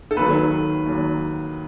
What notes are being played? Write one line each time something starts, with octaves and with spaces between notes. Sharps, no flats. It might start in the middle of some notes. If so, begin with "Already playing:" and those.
A4
D#2 D#3 F#3 B4
D#2 D#3 F#3